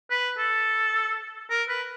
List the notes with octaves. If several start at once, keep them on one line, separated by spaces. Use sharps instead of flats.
B4
A4
A#4
B4